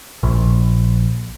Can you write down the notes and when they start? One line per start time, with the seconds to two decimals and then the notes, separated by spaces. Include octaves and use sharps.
0.23 A#1